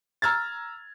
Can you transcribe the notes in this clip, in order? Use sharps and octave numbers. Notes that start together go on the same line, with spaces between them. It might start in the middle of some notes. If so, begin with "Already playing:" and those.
A#5 E6 F6 G#6 A6